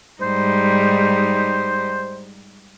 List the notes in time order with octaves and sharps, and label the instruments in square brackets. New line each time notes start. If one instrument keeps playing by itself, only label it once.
[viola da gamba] G#2 G3 D#4 [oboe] C5